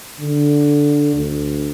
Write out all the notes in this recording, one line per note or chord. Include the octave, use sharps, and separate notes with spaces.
D3
D2